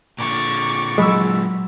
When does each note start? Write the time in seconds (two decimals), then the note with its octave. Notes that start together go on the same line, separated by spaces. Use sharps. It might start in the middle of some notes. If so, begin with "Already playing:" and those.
0.19 A#2 D3 C#6 D6
0.98 F#3 G#3 B5 E6 C7